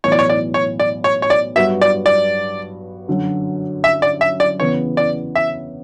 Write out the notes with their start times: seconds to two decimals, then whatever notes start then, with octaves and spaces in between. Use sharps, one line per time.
0.04 B1 A2 E3 C#5
0.12 D5
0.19 C#5
0.30 D5
0.54 C#5
0.79 D5
1.04 C#5
1.22 C#5
1.30 D5
1.56 G2 F#3 B3 F#4 E5
1.81 D5
2.06 D5
3.08 F#2 D3 F#3
3.84 E5
4.02 D5
4.21 E5
4.40 D5
4.60 E2 C#3 E3 B3 C#5
4.97 D5
5.35 E5